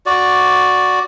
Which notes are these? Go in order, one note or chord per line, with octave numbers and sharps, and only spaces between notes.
F#4 D5